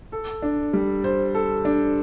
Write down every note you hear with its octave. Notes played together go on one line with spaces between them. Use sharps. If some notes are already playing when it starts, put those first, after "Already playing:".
A4
D4
G3
C5
A4
D4